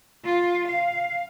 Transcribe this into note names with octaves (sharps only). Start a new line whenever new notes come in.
F4
F5